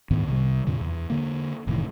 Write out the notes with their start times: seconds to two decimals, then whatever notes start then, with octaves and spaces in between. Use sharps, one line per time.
0.11 D2 G#2 D#3 B3
0.27 C2 C3 F3 G3
0.67 F2 A#2 D3
0.81 E2
1.10 D3 A#3
1.67 F1 A2 D#3 E3